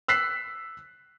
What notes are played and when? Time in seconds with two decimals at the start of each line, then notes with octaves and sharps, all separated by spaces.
0.08 E6 F#6 B6 C7